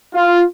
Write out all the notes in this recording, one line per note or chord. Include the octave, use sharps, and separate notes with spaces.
F4